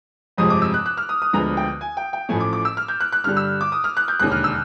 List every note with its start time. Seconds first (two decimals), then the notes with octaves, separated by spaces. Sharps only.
0.37 G1 F2 C3 F3 G#3 D#6
0.50 D6
0.62 E6
0.74 F#6
0.86 F#6
0.97 F6
1.09 D#6
1.22 D#6
1.33 D2 D3 F3 G#3 B3 A#5
1.57 G5
1.81 G#5
1.97 G5
2.13 G5
2.29 A1 A2 F3 A3 G#5
2.40 D6
2.53 D6
2.65 E6
2.77 F6
2.88 G6
3.00 F#6
3.12 F#6
3.24 G2 D3 G3 F6
3.37 E6
3.61 D6
3.72 D#6
3.84 F6
3.97 F#6
4.08 G6
4.20 E1 D#2 D3 F#6
4.32 F6
4.44 E6